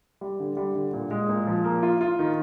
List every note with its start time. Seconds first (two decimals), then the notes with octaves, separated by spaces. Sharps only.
0.21 G3
0.40 D3
0.57 G3
0.76 D3
0.93 A#2
1.11 G#3
1.29 A#2
1.47 F3
1.64 A#3
1.83 F4
2.01 F4
2.19 D#3